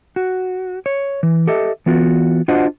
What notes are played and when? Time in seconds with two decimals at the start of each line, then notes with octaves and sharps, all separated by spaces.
0.16 F#4
0.86 C#5
1.23 E3
1.47 G4 A4 D#5 E5
1.86 E3 B3 F4 F#4
2.48 D4 F4 F#4 C5 D#5 F#5